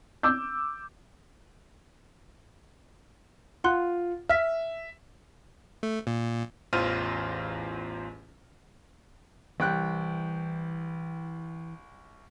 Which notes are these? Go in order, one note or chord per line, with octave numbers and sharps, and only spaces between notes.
D6 E6 G6
F4 F#5 C6 F#6
E5 F6 B6
A3
A#2
A1 E2 F4 C5 F6 D#7
C2 E3 G5 F#6